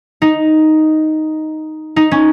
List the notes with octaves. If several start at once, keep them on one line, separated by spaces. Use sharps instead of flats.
D#4
D#4
C#4